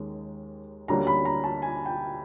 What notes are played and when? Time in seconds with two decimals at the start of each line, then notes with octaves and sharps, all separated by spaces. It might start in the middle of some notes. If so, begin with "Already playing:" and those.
Already playing: D#2 D#3 G#3 C#4
0.88 D2 D3 G3 A#3 C#4 A#5
1.07 B5
1.25 A#5
1.44 A5
1.62 G#5
1.86 G5